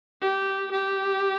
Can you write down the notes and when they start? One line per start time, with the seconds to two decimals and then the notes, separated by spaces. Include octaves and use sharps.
0.22 G4
0.71 G4